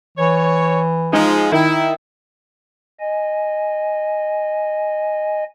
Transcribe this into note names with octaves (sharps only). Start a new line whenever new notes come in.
E3 C#5
F3 G#3 D#4
D#3 E4
D#5 G#5